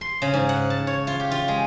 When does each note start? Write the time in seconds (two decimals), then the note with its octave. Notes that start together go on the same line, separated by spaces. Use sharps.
0.01 C6
0.22 C#3
0.34 G#2
0.49 F#5
0.70 A5
0.87 C#5
1.07 F4
1.20 G4
1.31 F4
1.48 G#3